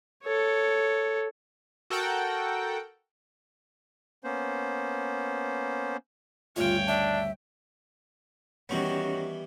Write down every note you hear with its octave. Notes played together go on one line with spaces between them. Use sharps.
A4 C#5
F#4 A4 A#4 F#5 G5
A#3 B3 C#4 C5
D2 G2 C#3 F4 C#5 G5
D4 E5
D#3 E3 G3 B3 C#4 F#4 G4 C#5